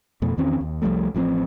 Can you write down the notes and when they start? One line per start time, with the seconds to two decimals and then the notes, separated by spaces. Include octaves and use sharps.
0.22 F2 B2 A3
0.37 E2 D#3 C4 C#4
0.61 D#2
0.82 C2 F3 G3 A3
1.15 A1 F3 G3 C4